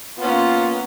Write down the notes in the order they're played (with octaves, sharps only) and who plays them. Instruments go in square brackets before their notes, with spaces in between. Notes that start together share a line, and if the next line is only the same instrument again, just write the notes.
[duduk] A#3 [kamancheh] B3 C#4 [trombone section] F4